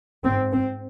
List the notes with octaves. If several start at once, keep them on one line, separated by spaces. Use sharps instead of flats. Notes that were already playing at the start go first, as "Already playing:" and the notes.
G#2 C4
C4